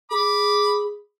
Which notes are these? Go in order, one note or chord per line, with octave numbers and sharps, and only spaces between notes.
G#4 B5 D6